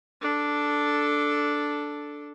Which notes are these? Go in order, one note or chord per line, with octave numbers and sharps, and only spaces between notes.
D4 A4